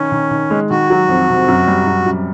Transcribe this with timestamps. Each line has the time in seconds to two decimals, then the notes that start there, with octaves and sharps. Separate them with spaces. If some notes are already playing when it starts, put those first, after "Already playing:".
Already playing: D#3 C#4
0.12 D#3
0.31 D#3
0.50 G#3
0.70 D#3 F#4
0.90 F#3
1.09 F2
1.29 C3
1.48 F#2
1.67 G3
1.87 F#2
2.06 F#2